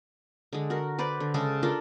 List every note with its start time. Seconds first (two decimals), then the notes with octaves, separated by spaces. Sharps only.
0.53 D3 G#3
0.70 F#4 A#4
0.99 B4 C5 D5
1.20 D3
1.34 C#3 G#3 A4
1.63 D4 F4 A4 A#4